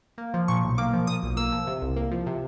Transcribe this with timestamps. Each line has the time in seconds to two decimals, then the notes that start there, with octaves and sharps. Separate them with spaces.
0.18 A#3
0.34 F3
0.48 A#2 C#6
0.63 B1
0.78 A#3 D6
0.93 F3
1.07 A#2 D#6
1.23 B1
1.37 A#3 E6
1.52 F3
1.67 C3
1.82 C2
1.96 A#3
2.11 F3
2.27 C3